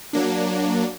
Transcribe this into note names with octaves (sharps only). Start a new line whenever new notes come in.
F#3 A#3 D4